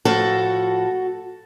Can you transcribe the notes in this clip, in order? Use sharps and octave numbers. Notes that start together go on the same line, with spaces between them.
A2 F3 F#4 A4